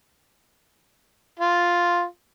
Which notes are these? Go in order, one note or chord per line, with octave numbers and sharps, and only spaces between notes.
F4